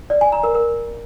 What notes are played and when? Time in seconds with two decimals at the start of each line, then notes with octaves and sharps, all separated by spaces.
0.10 D5
0.21 G#5
0.32 A#5
0.43 A#4
0.55 A#4